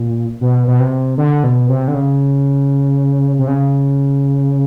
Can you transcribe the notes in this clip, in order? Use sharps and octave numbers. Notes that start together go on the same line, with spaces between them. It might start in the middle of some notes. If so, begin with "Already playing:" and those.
Already playing: A#2
B2
B2
C3
D3
B2
C3
D3
C#3
C3
C#3